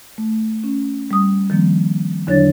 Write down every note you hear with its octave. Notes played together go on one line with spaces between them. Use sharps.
A3
C#4
G3 D#6
D#3 F3 G3 A#3 C4
E2 D3 F#3 D4 C#5 A6